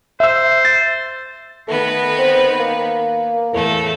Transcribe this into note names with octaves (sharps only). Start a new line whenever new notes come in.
C5 E5 E6
A6
D#3 A3 B3 B4
C4
A#3
E2 A2 A3 A4